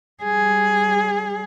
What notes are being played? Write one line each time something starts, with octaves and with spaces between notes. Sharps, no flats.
G3 G#4